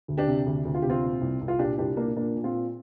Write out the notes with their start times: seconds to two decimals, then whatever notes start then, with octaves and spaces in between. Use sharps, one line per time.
0.08 D2
0.18 D4 G4
0.27 C3
0.46 D2
0.65 D2
0.74 F4
0.82 C3 G4
0.90 C4 F4
1.03 A#2
1.21 C2
1.41 C2
1.48 F4
1.59 A#2 D4 G4
1.78 C2 D4 G4
1.97 A#2 A#3 D4
2.16 A#2 A#3 D4
2.35 A#2
2.44 C4 F4
2.54 A#2